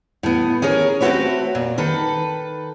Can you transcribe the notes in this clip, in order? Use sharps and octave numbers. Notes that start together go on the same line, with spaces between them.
A2 B3
C#4 G#4 A#4 C#5
A3 C4 C#4 F#4 B4 C#5
A#2
D#3 A4 B4